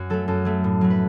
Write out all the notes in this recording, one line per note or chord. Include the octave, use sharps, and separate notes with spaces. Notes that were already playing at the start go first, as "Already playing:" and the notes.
Already playing: F#2 F#4
F#3 A3 A4
F#2 A4
F#3 A3
A2
F#3 A3
B4